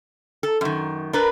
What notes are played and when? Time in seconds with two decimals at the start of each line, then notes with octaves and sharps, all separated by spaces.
0.43 A4
0.61 F#2 D#3
1.13 D4 A#4 B4